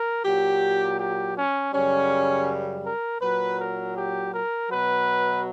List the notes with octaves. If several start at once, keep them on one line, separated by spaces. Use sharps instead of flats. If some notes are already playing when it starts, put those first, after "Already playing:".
Already playing: A#4
A#2 F#3 G4
G4
C#4
F#2 C#3 G3 C#4
A#4
A#2 F#3 B4
A#4
G4
A#4
B2 F#3 B4